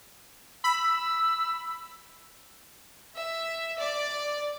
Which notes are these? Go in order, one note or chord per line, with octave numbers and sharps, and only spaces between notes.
B5 E6
E5
D5